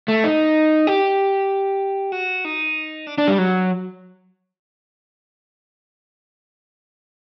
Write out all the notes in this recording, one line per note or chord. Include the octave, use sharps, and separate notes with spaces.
A3
D#4
G4
F#4
D#4
D4
D4
G3
F#3